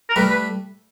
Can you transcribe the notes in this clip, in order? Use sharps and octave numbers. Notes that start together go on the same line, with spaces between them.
A#4
G3 A3 B4
B4